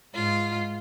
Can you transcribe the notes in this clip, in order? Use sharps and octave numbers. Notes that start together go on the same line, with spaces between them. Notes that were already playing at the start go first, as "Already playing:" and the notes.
G#2 F4